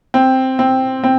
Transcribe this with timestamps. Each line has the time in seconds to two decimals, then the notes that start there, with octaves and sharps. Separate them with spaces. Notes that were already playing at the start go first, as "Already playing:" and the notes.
0.14 C4
0.59 C4
1.04 C4